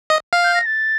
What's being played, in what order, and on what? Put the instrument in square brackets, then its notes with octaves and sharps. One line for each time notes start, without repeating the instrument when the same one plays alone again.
[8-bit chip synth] D#5
F5
[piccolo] G6
A#6
A6